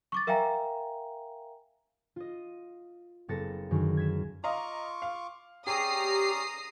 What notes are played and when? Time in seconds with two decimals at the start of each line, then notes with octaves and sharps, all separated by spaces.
0.12 C#6 D6 A6
0.27 A#4 E5 F5 G5 G#5 A#5
2.16 F4 D#5
3.28 F#1 B3 A4 A6 A#6 C#7
3.71 F#2 D3 D#3 G#3
3.97 G#6 B6 E7
4.44 F4 D#5 F5 A#5 C#6 D6
5.02 F5
5.67 C#4 G4 G#4 D5 A#5 D6 D#6 C7